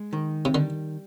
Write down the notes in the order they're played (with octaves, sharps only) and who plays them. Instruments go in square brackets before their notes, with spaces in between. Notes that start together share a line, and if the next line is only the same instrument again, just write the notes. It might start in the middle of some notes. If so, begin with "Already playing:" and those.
Already playing: [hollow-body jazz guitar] G#3
D#3
[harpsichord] C3
[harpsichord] D3 [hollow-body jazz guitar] G3